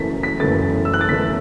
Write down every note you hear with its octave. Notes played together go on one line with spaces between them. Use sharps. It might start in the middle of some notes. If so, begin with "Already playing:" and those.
Already playing: F#1 F#2 E3 A3 B6
B6
F#1 F#2 E3 A3 A6
E6
F#6
A6
F#1 F#2 E3 A3 B6